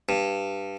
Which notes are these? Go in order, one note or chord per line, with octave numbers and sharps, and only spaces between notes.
G2